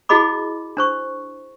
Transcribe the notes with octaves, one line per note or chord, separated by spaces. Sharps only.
E4 F#4 G#4 D#5 B5 D6
D4 C5 C#6